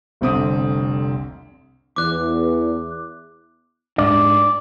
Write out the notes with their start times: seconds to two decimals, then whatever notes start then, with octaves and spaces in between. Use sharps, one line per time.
0.21 F1 C2 D3 C4 E5 D#6
1.96 E2 D6 F#6
3.98 G#2 G#3 D4 D5